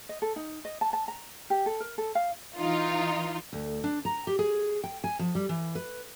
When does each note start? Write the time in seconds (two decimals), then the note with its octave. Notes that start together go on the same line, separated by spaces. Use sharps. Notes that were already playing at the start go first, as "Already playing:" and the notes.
0.09 D#5
0.22 A4
0.36 D#4
0.65 D#5
0.81 A5
0.93 A5
1.08 A#5
1.50 G4
1.66 A4
1.80 A#4
1.98 A4
2.15 F5
2.57 E3 D#4 F4
3.53 D2
3.84 D4
4.05 A#5
4.27 G4
4.39 G#4
4.84 G5
5.04 G#5
5.19 F3
5.35 G3
5.49 E3
5.75 B4